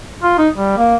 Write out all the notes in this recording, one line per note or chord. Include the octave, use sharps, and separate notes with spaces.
F4
D#4
G3
A#3